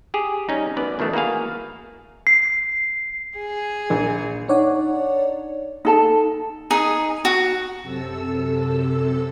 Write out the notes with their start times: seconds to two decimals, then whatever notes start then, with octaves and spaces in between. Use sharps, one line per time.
0.14 G4 G#4
0.49 G3 C#4 D#4
0.77 F#2 B3 D5
0.99 B2 D#3 E3 A3
1.13 A#3 E4 F#4 G#4 F5
2.27 C7
3.38 G#4
3.90 A#1
4.48 D4 D#4 C#5 D5 F#5
5.85 D#4 A4 A5
6.71 D#4 G#4
7.25 F#4
7.82 F#2 C3 A4 E6